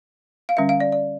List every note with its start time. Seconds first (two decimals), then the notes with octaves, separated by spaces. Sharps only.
0.49 F5
0.57 D3 G3 C#4 E5
0.69 F5
0.80 D5
0.92 D5